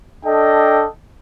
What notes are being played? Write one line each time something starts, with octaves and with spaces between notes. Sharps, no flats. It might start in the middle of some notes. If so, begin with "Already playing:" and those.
D4 A4 D#5 G5